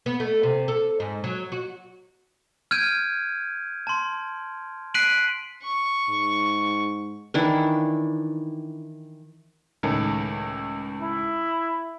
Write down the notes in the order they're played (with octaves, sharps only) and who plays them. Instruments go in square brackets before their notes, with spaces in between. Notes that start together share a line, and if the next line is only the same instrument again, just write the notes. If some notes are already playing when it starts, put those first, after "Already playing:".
[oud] B3
A3
C3
A4
G#2
F#3
F#4
[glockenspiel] F6 G6 G#6 D7 D#7
A5 C6
F#6 B6 C7 D7 D#7 F#7
[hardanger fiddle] C#6
[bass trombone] G#2
[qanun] D#3 E3 D4 E4
[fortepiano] C#2 A2 D#3
[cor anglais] E4